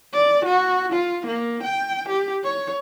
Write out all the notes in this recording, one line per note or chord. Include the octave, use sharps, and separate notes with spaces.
D5
F#4
F4
A#3
G5
G4
C#5